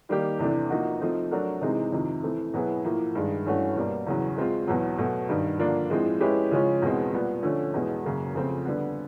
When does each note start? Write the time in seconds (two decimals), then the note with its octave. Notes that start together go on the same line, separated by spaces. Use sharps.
0.09 D#3 G3 A#3 D#4 G4
0.39 E2 C3 E3 A3 D4
0.70 F3 A#3 D#4 F#4
1.00 F3 A3 C4 D#4
1.31 F#3 A3 D4 F#4 A#4
1.61 C3 E3 G#3 C4 D#4
1.92 F2 C3 D#3
2.23 E3 A3 C4
2.54 B2 F#3 B3 E4 G#4
2.84 A2 F3 A#3
3.15 G2 D#3 G#3
3.46 G2 E3 A3 C#4 F#4
3.76 B2 G3 A#3
4.07 E2 C#3 F#3
4.37 G#3 C4 F4
4.68 E2 B2 F#3
4.98 B2 F#3 A3
5.29 G2 D#3 G3
5.59 D3 F3 A#3 D4
5.90 A2 F3 G#3 C4
6.20 G#3 C#4 E4 G4 B4
6.51 C#3 F3 G#3 C#4 F4
6.82 E2 B2 G#3 C4
7.13 A#2 G3 B3
7.43 D3 F3 A3 C#4
7.74 E2 B2 G#3
8.04 F#2 C#3 F#3 A#3
8.34 F2 C#3 F3 A3 C4
8.66 D3 G3 B3